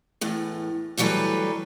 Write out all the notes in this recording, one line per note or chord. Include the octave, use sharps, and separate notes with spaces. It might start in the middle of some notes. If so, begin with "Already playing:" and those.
E2 A2
D2 E3 F#3 G3 A4 B4